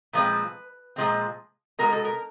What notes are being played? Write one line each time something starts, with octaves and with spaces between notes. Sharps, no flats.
A#2 F3 G#3 C4 B4
A#2 F3 G#3 C4
B2 G#3 B3 A#4
A4
A#4